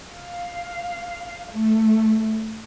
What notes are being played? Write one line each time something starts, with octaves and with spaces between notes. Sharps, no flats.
F5
A3